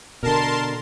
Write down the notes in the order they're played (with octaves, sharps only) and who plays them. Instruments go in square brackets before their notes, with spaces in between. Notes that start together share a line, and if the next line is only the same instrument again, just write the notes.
[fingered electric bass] B2 D3 [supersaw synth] A#4 A5 C6